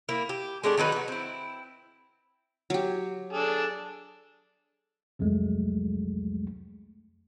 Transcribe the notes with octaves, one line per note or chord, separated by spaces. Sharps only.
A#3 E4
G4
G#3 A3 D4 G4
D#3 F#3 D#4 B4
F#4 B4
C4 E4
F#3 G4
D4 G#4 A4
C2 F2 F#3 G#3 A3